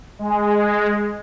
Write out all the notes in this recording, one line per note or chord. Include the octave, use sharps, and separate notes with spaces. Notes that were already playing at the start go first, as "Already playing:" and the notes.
G#3